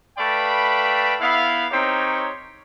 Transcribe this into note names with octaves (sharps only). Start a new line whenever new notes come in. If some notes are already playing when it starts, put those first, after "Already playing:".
A3 B4 D5 F5 G5 B5
B3 E4 F5
C4 D#4 G4 A#4 C#5